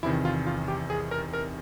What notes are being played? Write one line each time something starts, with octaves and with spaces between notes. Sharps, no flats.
E2 C3 D#3 E4
F4
F4
G4
G#4
A#4
A#4